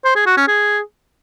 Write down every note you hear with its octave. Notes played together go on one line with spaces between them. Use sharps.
C5
G#4
F#4
C#4
G#4